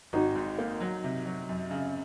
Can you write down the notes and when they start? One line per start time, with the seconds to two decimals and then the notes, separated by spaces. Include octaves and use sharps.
0.13 G#1 D#4 F#4
0.35 G#2
0.58 A#3
0.80 F#3
1.04 C3
1.26 F#3
1.49 F#2
1.71 C#3